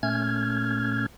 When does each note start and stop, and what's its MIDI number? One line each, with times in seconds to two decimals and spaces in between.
0.03 1.06 46
0.03 1.06 57
0.03 1.06 61
0.03 1.06 89
0.03 1.06 92